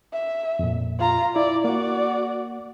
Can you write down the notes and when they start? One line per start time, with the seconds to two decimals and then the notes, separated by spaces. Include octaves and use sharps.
0.13 E5
0.59 F2 A#2
0.99 F4 A#5
1.36 E4 D5
1.64 A#3 F#4 D5